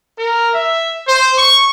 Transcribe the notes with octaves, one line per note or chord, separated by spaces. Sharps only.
A#4
E5
C5
C#6